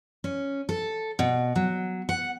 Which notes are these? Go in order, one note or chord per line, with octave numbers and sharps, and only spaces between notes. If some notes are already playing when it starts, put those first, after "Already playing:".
C#4
A4
B2
F#3
F#5